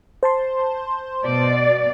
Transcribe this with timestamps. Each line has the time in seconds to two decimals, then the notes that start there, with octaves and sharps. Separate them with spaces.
0.23 C5 A5 C6
1.25 B2 D5